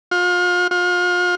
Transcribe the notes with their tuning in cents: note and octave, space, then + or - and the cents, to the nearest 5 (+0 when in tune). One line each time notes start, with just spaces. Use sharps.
F4 +35
F4 +35